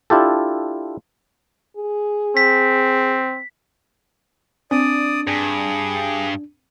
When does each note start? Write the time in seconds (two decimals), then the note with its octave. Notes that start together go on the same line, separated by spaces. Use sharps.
0.10 D4 E4 F4 G4 A4
1.77 G#4
2.37 C4 B6
4.71 C4 D4 D5 D#6
5.27 G2 G#4